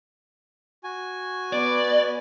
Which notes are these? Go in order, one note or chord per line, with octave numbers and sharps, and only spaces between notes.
F#4 G#5
B3 D5